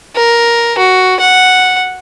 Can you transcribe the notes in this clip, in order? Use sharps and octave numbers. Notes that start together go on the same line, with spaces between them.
A#4
F#4
F#5